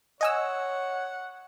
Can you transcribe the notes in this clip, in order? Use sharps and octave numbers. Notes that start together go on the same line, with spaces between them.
C#5 D#5 F#5 G#5 E6